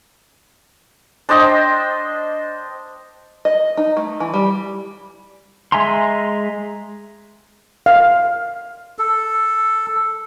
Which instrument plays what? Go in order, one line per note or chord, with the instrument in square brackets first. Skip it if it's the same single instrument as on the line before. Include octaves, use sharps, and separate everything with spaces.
[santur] D4 C5 D#5 G5
[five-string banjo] D#5
D#4
A3
E3
G3
[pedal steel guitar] G#3 E5 G#5 A#5 C6
[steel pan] F5
[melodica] A4